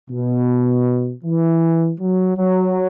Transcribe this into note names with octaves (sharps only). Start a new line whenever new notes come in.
B2
E3
F#3
F#3